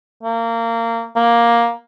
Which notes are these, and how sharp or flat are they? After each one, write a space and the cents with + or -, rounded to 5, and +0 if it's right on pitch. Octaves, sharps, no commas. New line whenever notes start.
A#3 -25
A#3 +10